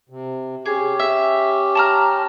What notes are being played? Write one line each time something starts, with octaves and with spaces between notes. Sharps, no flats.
C3
C#4 G4 G#4
E5
A5 A#5 F6